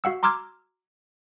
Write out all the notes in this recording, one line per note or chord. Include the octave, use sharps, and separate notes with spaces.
F#4 F5 F#5 E6
A#5 C6 D6 E6 F6 G#6